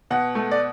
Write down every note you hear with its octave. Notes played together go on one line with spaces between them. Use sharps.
B2 F#5
A3
D5